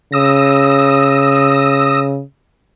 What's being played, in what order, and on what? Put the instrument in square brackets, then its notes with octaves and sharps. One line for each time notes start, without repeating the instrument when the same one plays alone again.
[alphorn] C#3 [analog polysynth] D#6 E6 A#6